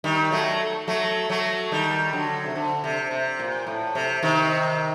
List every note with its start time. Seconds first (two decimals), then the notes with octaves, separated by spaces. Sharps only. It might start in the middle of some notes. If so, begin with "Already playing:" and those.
0.04 D#3 G3
0.31 F#3 A3
0.88 F#3 A3
1.29 F#3 A3
1.71 D#3 G3
2.13 D3 F#3
2.46 C3
2.55 D3
2.84 C3
3.11 C3
3.39 A#2
3.67 A2
3.95 C3
4.23 C3 D#3